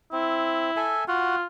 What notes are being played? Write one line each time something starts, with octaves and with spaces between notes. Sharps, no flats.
C4 E4
A4 E5 G#5
F4 F#4 F#5